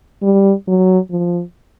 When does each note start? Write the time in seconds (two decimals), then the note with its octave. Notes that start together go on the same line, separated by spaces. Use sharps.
0.22 G3
0.67 F#3
1.11 F3